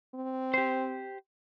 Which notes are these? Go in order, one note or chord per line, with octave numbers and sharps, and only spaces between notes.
C4
G4 C5